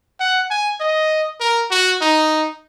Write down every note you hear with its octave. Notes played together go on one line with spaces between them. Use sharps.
F#5
G#5
D#5
A#4
F#4
D#4